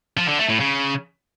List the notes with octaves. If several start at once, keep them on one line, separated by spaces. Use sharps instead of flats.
F3
D3
A3
A2
C#3